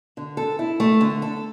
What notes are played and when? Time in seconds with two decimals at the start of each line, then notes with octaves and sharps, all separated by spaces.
0.17 D3
0.37 A4
0.59 E4
0.80 A3
1.01 D3
1.22 A4